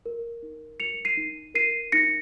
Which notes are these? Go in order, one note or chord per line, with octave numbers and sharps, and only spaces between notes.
A#4
D#4
A#4 C#7 F7
C7 D#7
D#4
A#4 C7 D#7
D#4 A#6 C#7